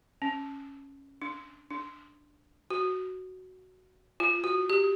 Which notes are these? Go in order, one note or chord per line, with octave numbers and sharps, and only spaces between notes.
C#4
D4
D4
F#4
F4
F#4
G4